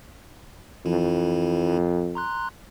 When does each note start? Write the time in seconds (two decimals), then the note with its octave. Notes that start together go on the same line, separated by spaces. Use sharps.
0.86 F2 E3 F3 E4
2.15 A#5 C6 F#6